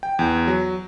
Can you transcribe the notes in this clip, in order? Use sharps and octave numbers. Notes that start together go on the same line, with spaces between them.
G5
E2
F#3